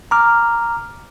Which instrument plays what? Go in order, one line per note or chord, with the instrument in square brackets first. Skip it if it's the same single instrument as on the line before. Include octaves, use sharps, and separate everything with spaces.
[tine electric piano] A#5 D6 F6